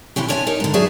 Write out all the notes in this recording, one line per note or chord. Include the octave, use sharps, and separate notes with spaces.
C3 E3 C#4 G4
C#4 D4 C#5 E5 F5 G#5
D#4 A#4 C#5
G#2 D3
F#2 F#4 G#4 D5 E5